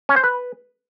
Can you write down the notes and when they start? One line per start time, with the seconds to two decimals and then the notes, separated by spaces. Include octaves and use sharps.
0.09 C#4
0.16 C5
0.24 B4